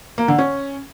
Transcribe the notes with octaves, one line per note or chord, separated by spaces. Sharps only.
A#3
D3
C#4